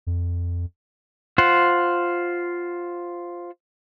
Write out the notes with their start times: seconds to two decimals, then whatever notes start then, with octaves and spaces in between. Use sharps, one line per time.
0.07 F2
1.38 F4 C5 F#5